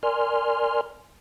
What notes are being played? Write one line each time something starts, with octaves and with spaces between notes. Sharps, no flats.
A#4 D5 G#5 C6 F6